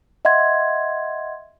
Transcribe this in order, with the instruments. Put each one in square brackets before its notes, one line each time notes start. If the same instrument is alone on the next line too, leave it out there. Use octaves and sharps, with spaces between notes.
[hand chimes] D#5 E5 F#5 C6 G#6